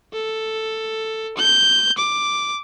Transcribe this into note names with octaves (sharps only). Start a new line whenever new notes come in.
A4
G6
D6